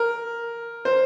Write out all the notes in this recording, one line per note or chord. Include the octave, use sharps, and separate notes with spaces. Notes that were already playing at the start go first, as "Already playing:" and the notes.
Already playing: A#4
C5